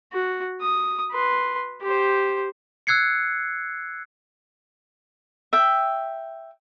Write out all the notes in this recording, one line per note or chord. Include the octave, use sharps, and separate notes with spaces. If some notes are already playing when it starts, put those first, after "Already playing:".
F#4
D#6
B4 C6
G4 C5
E6 F#6 G#6 C7 C#7
E5 G5